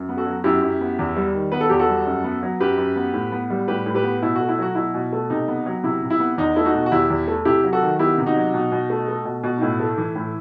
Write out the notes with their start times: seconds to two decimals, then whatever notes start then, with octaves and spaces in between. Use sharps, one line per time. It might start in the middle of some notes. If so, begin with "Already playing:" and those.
Already playing: F#2
0.09 B3
0.17 F#4 A4
0.26 F#3
0.44 F#2 E4 G4
0.62 F#2
0.81 B3
0.99 E2
1.17 G3
1.34 D#3
1.52 B3 B4
1.61 A4
1.70 E2 G4
1.79 F#4 A4
1.88 G3
2.07 F#2
2.24 B3
2.43 F#3
2.60 F#2 G4 B4
2.78 F#2
2.96 B3
3.14 A2
3.32 B3
3.50 G3
3.68 A2 G4 B4
3.86 A2
3.95 G4 B4
4.04 B3
4.22 B2 E4
4.35 A3 F#4
4.49 E4
4.59 F#3 F#4
4.75 B2 E4
4.94 B2
5.13 A3
5.30 C3 D#4
5.48 B3
5.66 F#3
5.83 C3 E4
6.02 C3
6.10 E4
6.20 B3
6.38 E2 D#4
6.56 A3 E4
6.65 D#4 F#4
6.75 B2
6.86 F#4
6.92 E2 E4 G4
7.10 E2
7.28 A3
7.45 C3 E4 G4
7.64 F#3
7.73 F#4 A4
7.82 D#3
7.99 B3 E4 G4
8.18 C3
8.26 D#4 F#4
8.36 F#3
8.54 B2
8.72 B2
8.90 A3
9.08 A3
9.25 B2
9.44 B2
9.57 D#4
9.61 A2 E4
9.80 A3
9.98 E3
10.16 A2